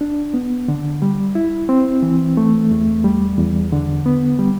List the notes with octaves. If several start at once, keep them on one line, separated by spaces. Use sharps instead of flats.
D4
B3
D3
G3
E4
C4
E3
A3
E2
G3
E2
D3
B3
G3